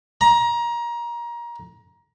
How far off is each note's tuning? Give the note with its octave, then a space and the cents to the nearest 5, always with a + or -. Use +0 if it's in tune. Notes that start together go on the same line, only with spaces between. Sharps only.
A#5 +25